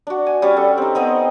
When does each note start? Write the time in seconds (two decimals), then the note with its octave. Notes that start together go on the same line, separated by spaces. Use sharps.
0.07 D4 F#4
0.26 G#5
0.42 G3 C#4
0.56 A4 F#5
0.77 C4 D#4
0.95 B3 C4 D#5